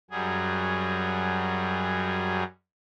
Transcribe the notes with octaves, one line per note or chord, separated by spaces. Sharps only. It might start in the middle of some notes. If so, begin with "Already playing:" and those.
F#2 F#3 G3 G#4